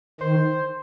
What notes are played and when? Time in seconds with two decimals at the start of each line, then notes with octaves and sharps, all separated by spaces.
0.21 D#3 C5